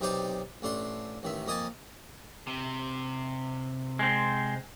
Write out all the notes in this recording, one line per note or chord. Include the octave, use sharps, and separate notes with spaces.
B1 C3 D#4 G4 C5 D5
A1 A3 D4 C6
A1 D#3 E5
F2 A#3 D#5 G#5 A5
C3
G#3 C4